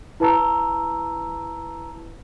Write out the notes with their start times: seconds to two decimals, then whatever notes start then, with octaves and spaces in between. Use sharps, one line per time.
0.20 E4 B4 A5 A#5 E6